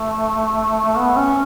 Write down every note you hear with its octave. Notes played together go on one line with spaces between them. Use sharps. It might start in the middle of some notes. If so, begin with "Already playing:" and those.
Already playing: A3
B3
C#4